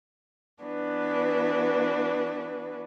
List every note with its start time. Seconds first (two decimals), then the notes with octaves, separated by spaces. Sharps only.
0.63 E3 B3 D4 F#4 B4